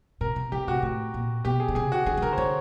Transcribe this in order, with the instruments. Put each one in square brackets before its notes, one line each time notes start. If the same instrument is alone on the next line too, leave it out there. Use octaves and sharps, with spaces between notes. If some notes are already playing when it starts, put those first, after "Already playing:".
[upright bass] B2 [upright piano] A#4
[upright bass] C3
[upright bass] C3 [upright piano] G4
[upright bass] A2 [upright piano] F#4
[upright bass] A2 [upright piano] F#4
[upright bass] A#2
[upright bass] B2 [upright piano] G4
[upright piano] G#4
[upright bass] D3
[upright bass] C#3 [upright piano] G#4
[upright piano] F#4
[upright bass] D3 [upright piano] G#4
[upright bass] D#3
[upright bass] D3 [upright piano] A#4
[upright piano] C5
[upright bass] D3 [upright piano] C#5